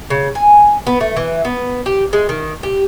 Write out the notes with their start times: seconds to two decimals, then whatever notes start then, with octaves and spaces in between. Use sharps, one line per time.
0.10 C#3
0.35 G#5
0.87 B3
1.01 A3
1.16 E3
1.45 B3
1.86 G4
2.13 G#3
2.29 D#3
2.63 G4